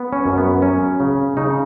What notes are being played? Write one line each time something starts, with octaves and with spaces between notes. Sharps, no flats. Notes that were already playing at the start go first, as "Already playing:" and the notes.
Already playing: B3
C#4
F#2
B3
F#3 C#4
C#3
C#3 D#4